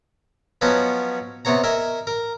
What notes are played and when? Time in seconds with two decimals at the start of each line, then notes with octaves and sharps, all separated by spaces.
0.61 F3 F#3 B3 C#4 B4 D#5
1.45 C3 B3 C#5 A#5
1.64 A#4 D#5 E5 G#5
2.07 A#4